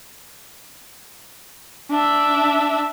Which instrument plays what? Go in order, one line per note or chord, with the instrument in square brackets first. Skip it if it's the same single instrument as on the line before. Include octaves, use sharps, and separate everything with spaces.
[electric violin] D4 E5